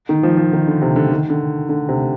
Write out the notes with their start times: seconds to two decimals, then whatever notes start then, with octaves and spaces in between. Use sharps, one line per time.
0.09 D#3
0.23 F3
0.37 F3
0.53 D#3
0.67 D3
0.82 C3
0.96 D3
1.11 D#3
1.30 D3
1.69 D3
1.89 C3